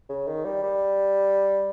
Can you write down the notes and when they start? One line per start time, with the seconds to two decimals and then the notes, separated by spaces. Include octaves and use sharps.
0.09 C#3
0.27 D#3
0.45 G3
0.63 G3